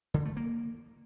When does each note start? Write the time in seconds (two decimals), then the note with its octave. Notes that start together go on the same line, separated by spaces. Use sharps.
0.14 D3
0.25 A3
0.37 A#3